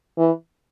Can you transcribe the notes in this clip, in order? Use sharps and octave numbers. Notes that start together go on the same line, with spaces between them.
E3